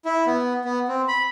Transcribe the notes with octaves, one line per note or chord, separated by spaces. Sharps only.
E4
B3
B3
C4
B5